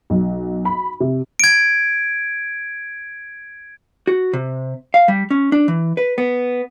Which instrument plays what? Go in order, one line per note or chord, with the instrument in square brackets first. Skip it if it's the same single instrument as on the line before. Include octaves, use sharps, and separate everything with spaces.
[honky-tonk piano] B1
B5
C3
[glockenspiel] G#6 D7
[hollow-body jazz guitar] F#4
C3
F5
G3
C#4
D4
E3
B4
B3